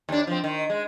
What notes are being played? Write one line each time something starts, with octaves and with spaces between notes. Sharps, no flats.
D#2 D4
F3 C4
D#3
G#3